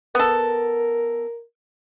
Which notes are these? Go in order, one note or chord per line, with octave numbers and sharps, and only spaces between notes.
B3 A4 A#4